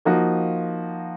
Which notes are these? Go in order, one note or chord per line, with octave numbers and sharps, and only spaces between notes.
F3 A#3 D#4 F#4